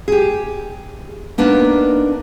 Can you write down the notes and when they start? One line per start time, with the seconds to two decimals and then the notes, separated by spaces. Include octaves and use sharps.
0.08 G4 G#4
1.38 A#3 B3 D4 D#4